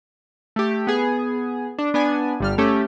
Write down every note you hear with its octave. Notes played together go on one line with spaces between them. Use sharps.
A3 G4
B3 G#4
D4
B3 D4 G#5
G1 G3 F6
A3 C#4 G4